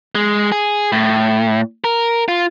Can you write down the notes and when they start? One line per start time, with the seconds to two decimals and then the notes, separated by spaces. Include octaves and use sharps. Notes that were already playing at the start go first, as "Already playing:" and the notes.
0.15 G#3
0.52 G#4
0.92 A2
1.84 A#4
2.28 F4